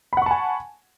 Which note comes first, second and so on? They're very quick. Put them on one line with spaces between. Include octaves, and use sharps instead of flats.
B5 F#5 C#6 A5 G#5